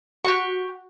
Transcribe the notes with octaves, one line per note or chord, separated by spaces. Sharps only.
F#4 G4 C#6